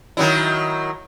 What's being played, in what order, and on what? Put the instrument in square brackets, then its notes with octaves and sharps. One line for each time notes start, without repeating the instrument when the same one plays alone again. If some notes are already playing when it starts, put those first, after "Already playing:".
[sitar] D#3 F#3 E4